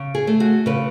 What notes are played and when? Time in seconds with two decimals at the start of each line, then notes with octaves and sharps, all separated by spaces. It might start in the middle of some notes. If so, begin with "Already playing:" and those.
Already playing: C#3
0.15 G#4
0.27 A3
0.40 F#4
0.66 C#3 B4